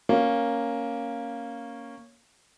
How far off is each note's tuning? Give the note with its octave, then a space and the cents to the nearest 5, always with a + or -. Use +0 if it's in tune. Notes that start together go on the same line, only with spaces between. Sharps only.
A#3 +0 C#4 +0